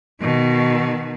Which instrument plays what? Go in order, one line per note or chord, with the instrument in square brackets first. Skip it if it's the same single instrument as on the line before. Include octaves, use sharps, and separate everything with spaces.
[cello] B2 D#3